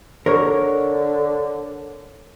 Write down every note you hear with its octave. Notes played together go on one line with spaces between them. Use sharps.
D3 A#4 C#5